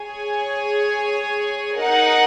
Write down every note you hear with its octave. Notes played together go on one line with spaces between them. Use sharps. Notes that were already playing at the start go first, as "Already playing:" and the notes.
Already playing: G#4 C#5 G#5
D#4 A#4 F#5